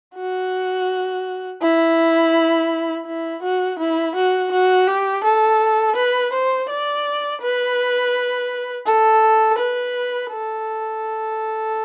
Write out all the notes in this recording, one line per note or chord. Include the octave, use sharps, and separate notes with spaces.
F#4
E4
E4
F#4
E4
F#4
F#4
G4
A4
B4
C5
D5
B4
A4
B4
A4